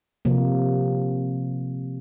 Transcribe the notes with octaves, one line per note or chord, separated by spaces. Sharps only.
C3 F3 A#3